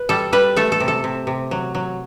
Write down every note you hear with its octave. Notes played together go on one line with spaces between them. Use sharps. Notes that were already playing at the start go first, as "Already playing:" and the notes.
Already playing: B4
G3 A4
G3 B4
A3 A4
A4
C3
A4
C3
C3
F#3
F#3